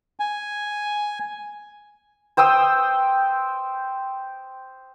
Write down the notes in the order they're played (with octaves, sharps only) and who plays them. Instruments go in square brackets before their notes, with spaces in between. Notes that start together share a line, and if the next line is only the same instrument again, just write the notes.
[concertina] G#5
[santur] C5 G5 D#6 E6